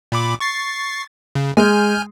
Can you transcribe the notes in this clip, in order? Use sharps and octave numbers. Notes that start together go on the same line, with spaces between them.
A#2 B5 D6
C#6 A6 C7
C#3
G#3 G#5 F6 G6